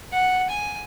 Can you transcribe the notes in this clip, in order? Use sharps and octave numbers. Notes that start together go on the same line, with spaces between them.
F#5
G#5